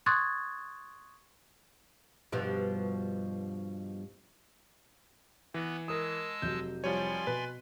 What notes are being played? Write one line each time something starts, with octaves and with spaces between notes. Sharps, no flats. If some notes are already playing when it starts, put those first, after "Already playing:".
C6 C#6 D#6 F#6 G#6 A6
G2 B2 F3
E3 B3 B4 A#6
G#3 A#4 A5 D#6 E6
F1 F#3 G6
F3 G3 C#5 D5 G#5 C6
B2 B4